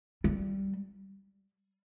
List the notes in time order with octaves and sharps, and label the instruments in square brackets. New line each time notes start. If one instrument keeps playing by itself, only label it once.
[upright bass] G3